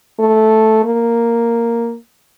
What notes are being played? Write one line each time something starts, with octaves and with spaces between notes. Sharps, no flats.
A3
A#3